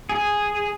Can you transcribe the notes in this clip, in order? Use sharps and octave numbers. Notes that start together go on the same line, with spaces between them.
G#4